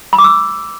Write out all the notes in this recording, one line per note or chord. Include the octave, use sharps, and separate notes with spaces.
B5
D6
E6